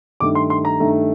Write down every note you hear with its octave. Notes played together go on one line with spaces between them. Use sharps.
G2 D#3 A3 D6
C6
C6
A#5
G2 D#3 A3